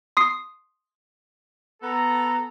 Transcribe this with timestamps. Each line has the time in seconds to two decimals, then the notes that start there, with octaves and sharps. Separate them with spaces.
0.17 C6 D#6 C7
1.82 B3 A4 A#5